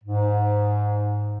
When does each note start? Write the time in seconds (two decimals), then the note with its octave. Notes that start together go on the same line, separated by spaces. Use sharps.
0.04 G#2